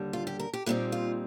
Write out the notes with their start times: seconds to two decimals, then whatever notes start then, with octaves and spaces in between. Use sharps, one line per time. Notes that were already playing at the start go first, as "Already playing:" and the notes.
Already playing: D#2 D3 G3
0.13 F4
0.27 G4
0.39 A#4
0.53 G4
0.66 A#2 G3 C4 D#4 G4
0.92 F4